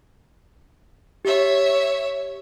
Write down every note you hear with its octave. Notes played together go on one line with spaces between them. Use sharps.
G4 C#5 E5